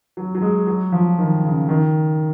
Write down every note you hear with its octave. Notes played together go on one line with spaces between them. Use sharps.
F#3
F#3
G#3
F#3
F3
D#3
C#3
D#3